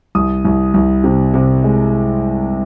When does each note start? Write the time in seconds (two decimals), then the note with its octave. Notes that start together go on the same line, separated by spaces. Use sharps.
0.15 C2 D#6
0.45 C2
0.74 C2
1.04 C3
1.34 C3
1.64 G#3